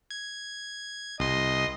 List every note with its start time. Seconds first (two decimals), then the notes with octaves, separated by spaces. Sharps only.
0.11 G#6
1.20 C2 D#5 C6